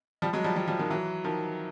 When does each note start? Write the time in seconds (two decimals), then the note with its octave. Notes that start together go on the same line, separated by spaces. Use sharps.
0.22 F3 G3
0.33 F#3 G#3
0.44 F3 G3
0.56 F3 G3
0.67 F3 G3
0.79 D#3 F3
0.90 E3 F#3
1.24 D#3 F3